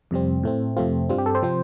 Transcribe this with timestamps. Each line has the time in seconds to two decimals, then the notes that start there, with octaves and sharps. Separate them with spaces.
0.11 F2 C3 G3 C4
0.43 A2 A3 C4
0.77 F2 C3 A3 C4 F4
1.09 G2 G3 C4 F4
1.18 G4
1.26 A4
1.35 C5
1.43 C3 F3 C4